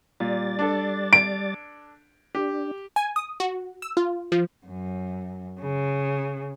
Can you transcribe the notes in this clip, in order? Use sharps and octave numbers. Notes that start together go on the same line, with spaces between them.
A#2 G3 D5 A6
D4 A4
D7
D4 G4
G#5
D#6
F#4
E6
F4
F3
F#2
C#3